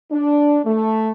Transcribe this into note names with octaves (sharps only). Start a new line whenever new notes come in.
D4
A3